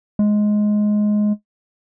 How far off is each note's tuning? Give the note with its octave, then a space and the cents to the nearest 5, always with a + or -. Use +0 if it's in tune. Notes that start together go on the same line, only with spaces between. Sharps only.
G#3 +10